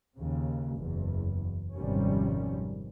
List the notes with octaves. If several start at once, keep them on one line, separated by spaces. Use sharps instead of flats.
D#2 C#3
F#1 E2
G#1 F2 C3 D#3 G3 C#4